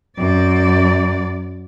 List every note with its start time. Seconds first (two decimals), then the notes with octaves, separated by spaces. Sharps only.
0.18 F#2 D5